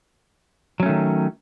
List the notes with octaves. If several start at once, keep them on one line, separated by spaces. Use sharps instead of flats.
D#3 F#3 A3 C#4